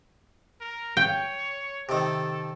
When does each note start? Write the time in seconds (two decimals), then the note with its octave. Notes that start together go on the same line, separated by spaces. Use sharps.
0.61 A#4
0.97 C#5 G5
1.89 C3 D#3 A4